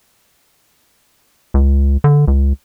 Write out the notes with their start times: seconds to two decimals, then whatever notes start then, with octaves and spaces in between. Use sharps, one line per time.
1.54 C#2
2.04 D3
2.28 C#2